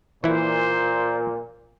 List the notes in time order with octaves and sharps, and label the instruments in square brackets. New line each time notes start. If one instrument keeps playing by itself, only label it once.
[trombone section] A#2 [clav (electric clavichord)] E3 E4 [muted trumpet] C5